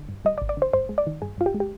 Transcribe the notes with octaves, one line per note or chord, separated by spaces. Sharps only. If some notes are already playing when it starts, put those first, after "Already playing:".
Already playing: D3
G2
G3 D#5
D5
G#1
D5
D3 C5
G2 C5
G#3
D5
D#3
G2 G#4
G2 F4
G4
G#3
G4